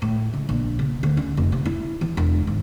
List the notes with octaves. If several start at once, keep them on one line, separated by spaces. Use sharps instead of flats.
A2
C#2
A#1
C#3
D2
C#4
F1
C3
E4
E3
E1
G#1